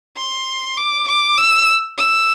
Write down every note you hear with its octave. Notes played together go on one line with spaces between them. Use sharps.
C6
D6
D6
E6
E6